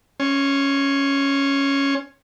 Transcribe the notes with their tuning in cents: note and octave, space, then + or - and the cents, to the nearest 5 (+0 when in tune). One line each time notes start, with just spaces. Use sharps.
C#4 +0 C6 +35